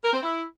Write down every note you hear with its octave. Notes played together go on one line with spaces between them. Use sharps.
A#4
C4
E4